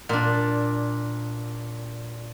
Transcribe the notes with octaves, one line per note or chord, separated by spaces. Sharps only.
A#2 D4